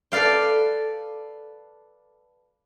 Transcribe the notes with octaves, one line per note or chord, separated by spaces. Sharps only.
A4 B4 D5 F5 G5